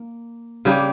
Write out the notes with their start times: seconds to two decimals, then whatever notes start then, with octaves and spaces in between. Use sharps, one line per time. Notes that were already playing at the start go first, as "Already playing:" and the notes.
Already playing: A#3
0.65 C#3 G3 A#3 G4